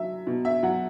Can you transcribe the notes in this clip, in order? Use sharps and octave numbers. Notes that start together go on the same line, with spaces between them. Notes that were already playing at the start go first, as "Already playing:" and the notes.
Already playing: F#3 E5
B2
E5
F#3 F#5